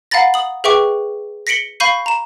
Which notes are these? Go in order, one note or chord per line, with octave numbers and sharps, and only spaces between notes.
F5 F#5 A#5 B5 A6 A#6
D#6 F#7
G#4 B4 E5 G5 C#6 D6
A#6 B6 C#7 D7 F#7 G7
F5 B5 C#6 G6 C7 D#7
A#5 E7